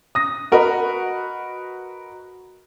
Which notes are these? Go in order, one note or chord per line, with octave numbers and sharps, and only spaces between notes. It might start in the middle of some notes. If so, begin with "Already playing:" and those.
D#6 A#6
F#4 A#4 B4 D#5 B5